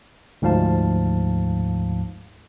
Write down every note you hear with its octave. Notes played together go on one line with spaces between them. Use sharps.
D2 G#2 F3 F5 A5